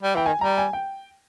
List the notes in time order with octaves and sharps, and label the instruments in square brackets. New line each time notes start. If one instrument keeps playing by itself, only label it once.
[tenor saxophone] G3
[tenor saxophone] E3 [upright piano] G5
[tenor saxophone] D#3 [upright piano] G#5
[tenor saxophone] G3 [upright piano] A#5
[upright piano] G#5
G5